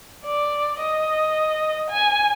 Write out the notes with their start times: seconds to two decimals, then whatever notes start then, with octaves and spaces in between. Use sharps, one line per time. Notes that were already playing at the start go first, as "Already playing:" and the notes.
0.24 D5
0.79 D#5
1.90 G#5